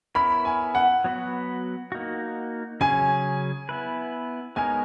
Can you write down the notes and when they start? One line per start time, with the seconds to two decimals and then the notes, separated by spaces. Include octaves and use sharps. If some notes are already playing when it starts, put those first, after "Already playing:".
0.15 B3 E4 A#4 C#5 B5
0.45 G#5
0.75 F#5
1.04 F#3 B3 F#4 B4
1.92 A#3 D#4 F#4
2.81 C#3 F#3 C#4 G#4 C#5 G#5
3.69 B3 E4 B4
4.56 G#3 B3 D#4 A#4 C#5 G#5